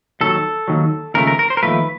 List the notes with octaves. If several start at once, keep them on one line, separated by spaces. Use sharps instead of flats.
D#2 D#3 F#3 A4
D#2 D#3 F#3
D#2 C#3 F3 A3 A#4
A#4
A#4
C5
A#4
D#2 C#3 F3 A3 B4